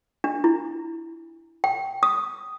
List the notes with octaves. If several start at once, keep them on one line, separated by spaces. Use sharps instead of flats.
D4
E4
G5
D#6